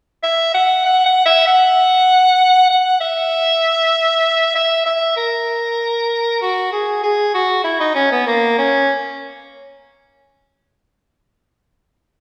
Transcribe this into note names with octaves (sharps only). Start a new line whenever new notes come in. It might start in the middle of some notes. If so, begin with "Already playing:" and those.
E5
F#5
F#5
F#5
E5
F#5
F#5
E5
E5
E5
A#4
F#4
G#4
G#4
F#4
E4
D#4
C#4
B3
A#3
C#4